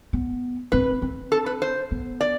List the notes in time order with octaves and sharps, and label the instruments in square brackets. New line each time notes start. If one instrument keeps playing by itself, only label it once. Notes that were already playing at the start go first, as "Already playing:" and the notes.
[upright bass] B3
[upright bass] C4 [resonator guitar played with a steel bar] B4
[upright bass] C4
[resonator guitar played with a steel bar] A4
B4
C5
[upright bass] B3
[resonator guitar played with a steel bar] D5